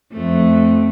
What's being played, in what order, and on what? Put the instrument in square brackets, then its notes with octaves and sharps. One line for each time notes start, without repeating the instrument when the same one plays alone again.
[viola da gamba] F2 A3